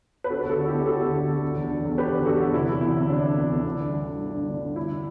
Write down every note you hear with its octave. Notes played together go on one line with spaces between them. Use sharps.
B4
D3 F#4 A4
D2 F#4 A4
D3
E4 G4
D2
D3 F#4 A4
D2
D3
D2
D3
E2
D3
E2
D3 G4 B4
E2
D3 F#4 A4
E2
C3 E4
E3
D2 E4
D2
C3 D4
E3
D2
D2
D3
G2
D3
G2
D3
G2
D3
G2
D3 E4